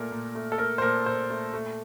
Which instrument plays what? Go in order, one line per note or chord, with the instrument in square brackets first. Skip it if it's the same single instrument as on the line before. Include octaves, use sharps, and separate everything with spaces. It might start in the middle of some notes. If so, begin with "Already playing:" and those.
Already playing: [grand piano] A#2 A3 A#4
A#2
A3
A4
A3 A#4
C5
A#2 A#4
A#2 C5
A3
A3